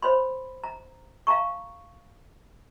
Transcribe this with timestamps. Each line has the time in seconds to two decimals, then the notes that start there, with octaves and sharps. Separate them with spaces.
0.02 C5 C#5 B5 C6
0.64 A#5
1.27 F5 A5 A#5 C#6